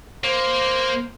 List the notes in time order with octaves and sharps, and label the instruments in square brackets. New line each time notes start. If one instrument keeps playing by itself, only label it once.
[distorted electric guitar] A#3 [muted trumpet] C5